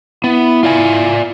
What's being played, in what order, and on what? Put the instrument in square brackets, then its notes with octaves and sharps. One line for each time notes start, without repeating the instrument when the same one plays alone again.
[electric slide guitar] B3 [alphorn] E4
[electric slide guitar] F4 D5 G#5